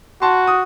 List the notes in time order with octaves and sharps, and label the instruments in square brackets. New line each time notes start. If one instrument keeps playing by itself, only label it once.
[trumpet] F#4 [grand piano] A5 C6
[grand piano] D#6